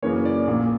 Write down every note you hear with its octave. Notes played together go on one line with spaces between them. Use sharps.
F#2 C#3 E3 A#3 C#5
D5
A#1 A#2 A#3